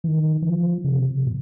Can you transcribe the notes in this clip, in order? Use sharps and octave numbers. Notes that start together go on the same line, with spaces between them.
E3
D#3
E3
F3
C#3
C3
A#2